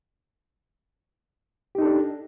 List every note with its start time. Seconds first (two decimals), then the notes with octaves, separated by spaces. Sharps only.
1.75 G4
1.78 D#4
1.82 A4
1.85 D4